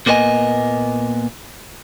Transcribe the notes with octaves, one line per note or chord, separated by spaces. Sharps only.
A#2 A#3 B3 G4 D#5 G#5